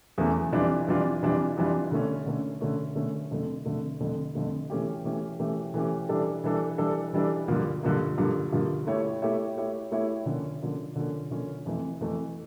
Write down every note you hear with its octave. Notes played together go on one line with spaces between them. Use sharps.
E2 C#3 E3 A3
F2 E3 G3 D4 F4
F2 E3 G3 D4 F4
F2 E3 G3 D4 F4
F2 E3 G3 D4 F4
D3 A3 C#4
D3 A3 C#4
D3 A3 C#4
D3 A3 C#4
F2 D3 A3
F2 D3 A3
F2 D3 A3
F2 D3 A3
E3 A3 C#4 G4
E3 A3 C#4 G4
E3 A3 C#4 G4
E3 A3 C#4 G4
E3 G3 D4 A4
E3 G3 D4 A4
E3 G3 D4 A4
E3 G3 D4 A4
G2 D3 F3 A#3
G2 D3 F3 A#3
G2 D3 F3 A#3
G2 D3 F3 A#3
A3 E4 G4 C#5 E5
A3 E4 G4 C#5 E5
A3 E4 G4 C#5 E5
A3 E4 G4 C#5 E5
D3 F3 A#3 C#4
D3 F3 A#3 C#4
D3 F3 A#3 C#4
D3 F3 A#3 C#4
F2 E3 A3
F2 E3 A3